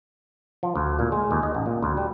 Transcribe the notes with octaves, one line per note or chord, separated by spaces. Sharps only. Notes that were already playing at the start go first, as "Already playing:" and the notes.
F3
D2
A#2
G#3
D#2
D#5
A1
A#2
D2
G3